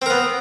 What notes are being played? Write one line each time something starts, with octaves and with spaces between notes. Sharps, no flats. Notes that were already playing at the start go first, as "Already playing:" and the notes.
B3 C4 A#4